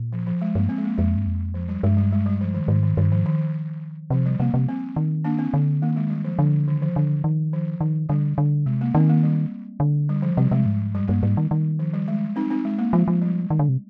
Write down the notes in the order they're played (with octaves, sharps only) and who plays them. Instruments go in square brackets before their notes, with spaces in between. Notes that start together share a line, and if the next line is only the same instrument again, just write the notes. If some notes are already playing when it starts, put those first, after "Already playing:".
Already playing: [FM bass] A#2
[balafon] F3
F3
G#3
[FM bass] G2 [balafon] A#3
[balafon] C4
G#3
A#3
[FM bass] F2 [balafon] G#3
[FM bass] G2
F2
[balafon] F3
G3
[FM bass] G2 [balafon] G#3
[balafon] G3
G#3
G3
F3
D#3
[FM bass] G#2 [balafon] D#3
[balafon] D#3
[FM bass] G2 [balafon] D#3
[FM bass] G#2 [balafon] F3
[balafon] D#3
[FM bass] C3 [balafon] F3
[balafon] G3
[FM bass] C3 [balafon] A#3
[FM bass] C3
[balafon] C4
[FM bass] D#3
[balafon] A#3 D4
C4
[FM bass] D3
[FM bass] D#3 [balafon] A#3
[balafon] G#3
G3
F3
[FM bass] D3 [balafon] F3
[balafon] D#3
F3
[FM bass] D3
D#3
[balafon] F3
[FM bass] D#3
[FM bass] D3 [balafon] G3
[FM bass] D3
[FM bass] C3 [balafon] G#3
[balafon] A#3
[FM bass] D#3 [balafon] C4
[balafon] A#3
G3
[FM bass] D3
[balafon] G3
F3
[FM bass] C3 [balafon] G3
[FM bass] C3 [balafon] G#3
[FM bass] G#2
[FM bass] G2 [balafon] G3
[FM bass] G#2
[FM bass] G2 [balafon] A#3
[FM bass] G#2 [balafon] G3
[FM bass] D#3
D#3
[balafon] F3
G3
G#3
C4 D#4
C4 D#4
G#3
A#3
[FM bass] F3 [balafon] G#3
[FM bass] F3
[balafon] G3
[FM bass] D#3
D3
C3